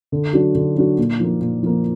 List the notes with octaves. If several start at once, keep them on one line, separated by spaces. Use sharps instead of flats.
D3
F#3 D4 F#4
D3
F#3 D4 F#4
A#2
F3 A#3
A#2
F3 A#3